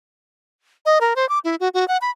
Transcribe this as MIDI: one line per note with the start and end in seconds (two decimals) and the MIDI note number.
0.86 0.99 75
1.01 1.14 70
1.16 1.28 72
1.29 1.39 86
1.44 1.56 64
1.60 1.69 66
1.74 1.87 66
1.88 1.98 78
2.02 2.10 83